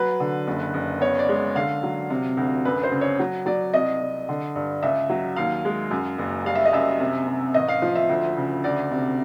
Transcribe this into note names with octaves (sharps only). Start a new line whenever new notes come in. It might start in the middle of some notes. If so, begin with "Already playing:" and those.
Already playing: F#3 B4
D3
F#1
F#1
B3 C#5
D5
G#3
D3 F5
F#3
C3
D2
F#2 B4
C5
C#3
C#5
F#3
F#3 D5
C2 D#5
C2
D3
G2
C#2 E5
F#3
D#2 F5
G#3
F#2
F#1
G3 F5
E5
D#5
F#2 E5
C3
C3
A1 D#5
F5
F3
E5
D2
C#3
D2 D5
C3